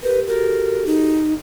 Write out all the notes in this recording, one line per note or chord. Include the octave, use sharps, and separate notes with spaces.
G4 A#4 B4
F#4 G4 A4 A#4
D#4